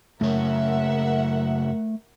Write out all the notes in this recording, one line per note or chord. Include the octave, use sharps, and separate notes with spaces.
F#2 C#3 A3 A#4 C#5 E5 F#5